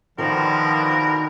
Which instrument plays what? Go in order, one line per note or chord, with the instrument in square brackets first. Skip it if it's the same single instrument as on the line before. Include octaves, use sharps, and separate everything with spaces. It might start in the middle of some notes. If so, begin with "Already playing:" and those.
[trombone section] B2 D3 [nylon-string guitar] D#3 [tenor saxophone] F3 [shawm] A#4